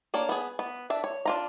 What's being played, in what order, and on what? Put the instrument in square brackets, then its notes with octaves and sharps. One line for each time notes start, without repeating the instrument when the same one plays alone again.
[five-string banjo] A#3 D4 C#5
B3 G#4
B3
D4 E5
C#5
D4 F4 A#5